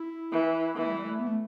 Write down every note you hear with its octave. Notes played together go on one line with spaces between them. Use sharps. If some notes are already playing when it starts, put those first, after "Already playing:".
Already playing: E4
E3
E3 B3
A3
G3
A3
B3
A3